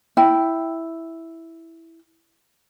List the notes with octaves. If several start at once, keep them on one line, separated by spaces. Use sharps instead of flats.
E4 G5